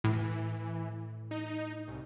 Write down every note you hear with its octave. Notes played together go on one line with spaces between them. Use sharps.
A2 E3
D#4
C2